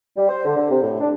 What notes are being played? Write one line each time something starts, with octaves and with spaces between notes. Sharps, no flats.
G3
C5
D3
D3
C3
A2
D4